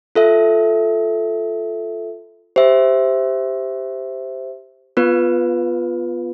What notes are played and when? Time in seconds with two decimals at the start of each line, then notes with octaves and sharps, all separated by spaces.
0.15 F4 A4 E5
2.56 G4 C5 E5
4.97 B3 F4 B4